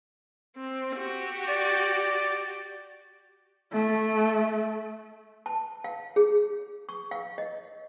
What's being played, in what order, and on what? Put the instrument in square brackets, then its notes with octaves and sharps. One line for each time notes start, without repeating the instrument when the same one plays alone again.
[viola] C4
F#4 G4
[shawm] D5
[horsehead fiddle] A3
[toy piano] A5
F5
G#4
C#6
F5
D#5